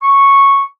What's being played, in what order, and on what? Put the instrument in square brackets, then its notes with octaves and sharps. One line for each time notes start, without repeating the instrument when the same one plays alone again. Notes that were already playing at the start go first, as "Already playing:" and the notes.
[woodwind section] C#6